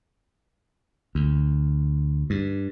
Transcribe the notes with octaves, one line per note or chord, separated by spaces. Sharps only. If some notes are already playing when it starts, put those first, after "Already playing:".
D2
G2